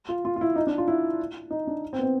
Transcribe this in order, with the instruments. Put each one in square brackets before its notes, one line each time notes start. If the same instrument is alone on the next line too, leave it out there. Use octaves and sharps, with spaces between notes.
[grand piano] F4
F4
F4
E4
D#4
D4
F4
E4
D#4
D4
C4
B3
C4